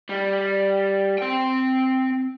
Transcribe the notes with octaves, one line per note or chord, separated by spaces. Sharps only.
G3
C4 G5